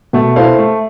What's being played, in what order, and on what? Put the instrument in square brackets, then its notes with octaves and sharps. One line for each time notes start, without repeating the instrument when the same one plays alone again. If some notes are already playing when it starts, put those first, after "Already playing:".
[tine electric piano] B2 B3 [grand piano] A3
[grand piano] E4 A4 C5 F5
A3